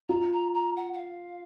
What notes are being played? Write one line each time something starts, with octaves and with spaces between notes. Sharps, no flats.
F4 A#5
A#5
A#5
F#5
F#5
F5